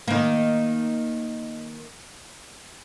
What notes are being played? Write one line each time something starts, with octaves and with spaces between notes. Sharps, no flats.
D#3 A#3